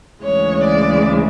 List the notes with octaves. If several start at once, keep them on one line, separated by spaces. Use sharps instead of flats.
D2 C#3 E3 G#3 C#5
D5